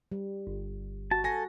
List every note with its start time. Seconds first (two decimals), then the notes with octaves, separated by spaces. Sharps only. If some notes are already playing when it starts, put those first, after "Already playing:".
0.12 G3
0.47 G1
1.11 F#4 A5
1.24 A4 G#5 A#6